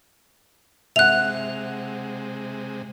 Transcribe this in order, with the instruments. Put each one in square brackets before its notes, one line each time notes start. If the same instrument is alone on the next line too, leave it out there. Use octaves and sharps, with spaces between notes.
[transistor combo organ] C3 G#3 [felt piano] E5 F#5 [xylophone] F#6 F7